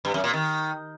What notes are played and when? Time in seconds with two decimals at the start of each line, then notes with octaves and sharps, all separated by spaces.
0.05 G2
0.14 F#2
0.24 A#2
0.33 D#3